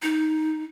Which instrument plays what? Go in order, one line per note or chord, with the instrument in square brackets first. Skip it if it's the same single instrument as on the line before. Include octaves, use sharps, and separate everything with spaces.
[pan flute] D#4